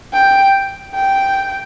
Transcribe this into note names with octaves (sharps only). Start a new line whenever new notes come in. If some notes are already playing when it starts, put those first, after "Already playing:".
G5
G5